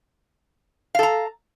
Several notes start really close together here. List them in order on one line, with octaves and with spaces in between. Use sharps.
F5 A4 A#5